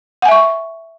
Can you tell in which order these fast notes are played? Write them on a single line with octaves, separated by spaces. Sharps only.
F#5 G#5 E5 C#6